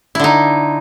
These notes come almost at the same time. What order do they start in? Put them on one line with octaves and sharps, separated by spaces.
E4 D3 D#4